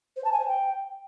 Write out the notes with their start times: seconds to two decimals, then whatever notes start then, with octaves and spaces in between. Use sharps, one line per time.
0.16 C5
0.24 A5
0.32 G#5
0.40 C5
0.47 G5